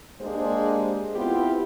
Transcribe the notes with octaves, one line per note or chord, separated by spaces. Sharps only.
G#3 A#3 D4 G4 G#4 C5
B3 C4 E4 F4 G4 B4